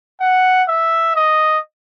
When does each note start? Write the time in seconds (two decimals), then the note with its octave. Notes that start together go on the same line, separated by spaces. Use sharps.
0.20 F#5
0.68 E5
1.16 D#5